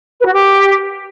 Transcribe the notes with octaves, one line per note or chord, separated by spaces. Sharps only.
B4
F#4
G4